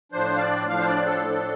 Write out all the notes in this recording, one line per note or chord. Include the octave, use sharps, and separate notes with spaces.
A2 F3 D4 C5
F5
D5
A2 F3 D4 F5
C5
D5
A4
A2 F3 D4